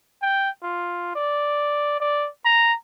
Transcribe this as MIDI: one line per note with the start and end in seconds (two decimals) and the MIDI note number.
0.22 0.50 79
0.63 1.11 65
1.16 1.98 74
2.00 2.29 74
2.45 2.73 82